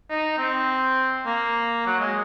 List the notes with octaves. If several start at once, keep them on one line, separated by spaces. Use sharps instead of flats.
D#4
C4
A#3
F#3
G#3